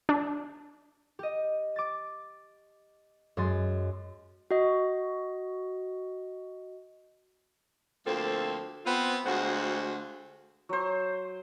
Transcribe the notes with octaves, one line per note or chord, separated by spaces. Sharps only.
D4
G4 D#5
D6 A6
F#2 G#3 C6 A6
F#4 D#5
D2 F3 A#3 C4 A4
B3 C4 F4
D2 G#3 F4 F#4 C5 F#5
F#3 C5